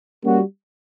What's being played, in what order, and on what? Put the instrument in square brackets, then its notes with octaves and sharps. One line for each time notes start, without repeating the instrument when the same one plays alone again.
[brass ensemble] G3 A#3 C#4 F#4